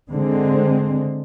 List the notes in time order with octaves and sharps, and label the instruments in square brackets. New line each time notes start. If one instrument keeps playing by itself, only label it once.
[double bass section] D3 G#3 C4